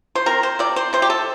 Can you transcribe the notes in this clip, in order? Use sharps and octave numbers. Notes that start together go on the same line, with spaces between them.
C5
C4 A#4
C5
C3 D5
C5
C3 C5
G4
A4